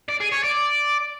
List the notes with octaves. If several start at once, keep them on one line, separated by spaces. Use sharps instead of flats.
D5
G#4
C#5
D5